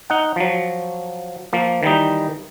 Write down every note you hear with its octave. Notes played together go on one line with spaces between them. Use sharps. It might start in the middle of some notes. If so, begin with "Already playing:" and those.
D#4 F#5
F3 F#3
F3 A#3
D#3 E3 G3 D#4